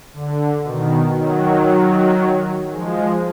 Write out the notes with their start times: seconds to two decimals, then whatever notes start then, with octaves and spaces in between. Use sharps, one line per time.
0.13 D3
0.64 B2 D#3
1.17 D#3 F#3
2.71 F3 G#3